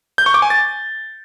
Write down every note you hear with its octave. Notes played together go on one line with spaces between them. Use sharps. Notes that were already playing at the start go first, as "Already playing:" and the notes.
G6
C#6
D6
G#5
A6